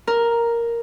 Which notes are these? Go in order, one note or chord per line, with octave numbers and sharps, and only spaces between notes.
A#4